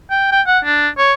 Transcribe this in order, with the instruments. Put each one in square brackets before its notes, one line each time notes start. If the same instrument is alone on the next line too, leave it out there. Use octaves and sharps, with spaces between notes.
[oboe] G5
G5
F#5
D4
C#5